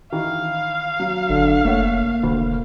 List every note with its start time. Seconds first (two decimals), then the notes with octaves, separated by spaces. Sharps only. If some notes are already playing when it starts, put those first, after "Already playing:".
0.12 D#3 E3 F5
1.00 F#3
1.30 G1 D3
1.65 F1 A3 A#3 C#5 F#5
2.23 E1 D2